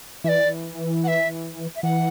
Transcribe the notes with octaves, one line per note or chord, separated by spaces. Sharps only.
E3 D5 E5
F#5
E5
E5
E3 F#5